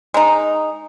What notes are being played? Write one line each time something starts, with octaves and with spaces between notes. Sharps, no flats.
G#3 D#4